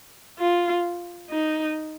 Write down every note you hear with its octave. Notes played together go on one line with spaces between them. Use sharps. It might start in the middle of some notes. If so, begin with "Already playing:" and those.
F4
D#4